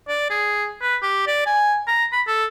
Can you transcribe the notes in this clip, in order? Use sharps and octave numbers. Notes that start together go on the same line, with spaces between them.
D5
G#4
B4
G4
D5
G#5
A#5
B5
A4